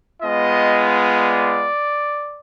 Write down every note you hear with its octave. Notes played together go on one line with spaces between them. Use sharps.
G#3 B3 F4 D#5
D5